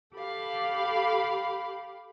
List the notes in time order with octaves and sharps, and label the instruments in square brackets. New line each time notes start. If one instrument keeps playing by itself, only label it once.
[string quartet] G4 A4 F5 B5